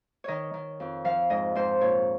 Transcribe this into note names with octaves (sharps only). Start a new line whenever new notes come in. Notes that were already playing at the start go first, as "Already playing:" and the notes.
D#3 C#5 D#5
D#3
F2
F3 F5
G#2 D#5
G#2 C5
A#2 C#5